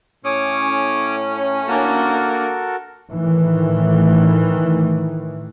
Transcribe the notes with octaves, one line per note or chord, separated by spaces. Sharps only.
A2 C#4 C#5 D6 D#6
A#3 D4 F#4 A4 A#4
A2 D#3 E3